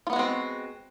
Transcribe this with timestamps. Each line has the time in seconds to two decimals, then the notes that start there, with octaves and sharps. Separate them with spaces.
0.07 F4
0.10 B3
0.13 F#4
0.16 G#3
0.19 C4